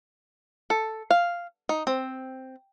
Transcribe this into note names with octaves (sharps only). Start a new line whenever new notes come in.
A4
F5
D#4
C4